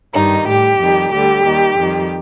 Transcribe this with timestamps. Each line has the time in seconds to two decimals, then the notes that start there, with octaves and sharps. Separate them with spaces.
0.14 G2 D#3 G3 D#4
0.47 A2 G3 G4
0.79 F2 D#3 G3
1.11 D2 D3 G3 G4
1.44 D#2 D#3 G3
1.76 F2 D#3 G3